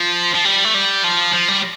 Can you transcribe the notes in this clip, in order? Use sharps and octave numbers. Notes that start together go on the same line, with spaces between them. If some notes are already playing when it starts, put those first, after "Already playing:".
Already playing: F3
F3
G3
A3
G3
F3
F3
G3